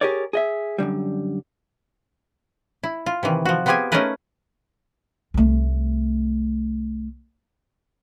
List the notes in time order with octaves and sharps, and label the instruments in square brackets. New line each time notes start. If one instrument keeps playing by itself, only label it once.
[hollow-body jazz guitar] G4 G#4 A#4 C#5 D5
G#4 D#5 E5
F#2 B2 D3 G3
[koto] E4
F4
C3 D#3 E3
F3 F#4
B3 C4 F4 G4 G#4 G#5
A3 C#4 D#4 G#4 A#4 B4
[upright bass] C2 A3